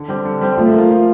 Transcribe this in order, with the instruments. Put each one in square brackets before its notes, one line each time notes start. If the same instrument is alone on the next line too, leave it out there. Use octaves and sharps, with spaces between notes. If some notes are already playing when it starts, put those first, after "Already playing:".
Already playing: [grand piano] D3
G3 C4 G4
D3
G3 C4 G4
[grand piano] F3 [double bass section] A3
[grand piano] A#3 F4
F3